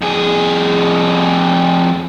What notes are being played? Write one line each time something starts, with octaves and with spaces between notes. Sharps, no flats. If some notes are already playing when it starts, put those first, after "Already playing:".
F2 G#4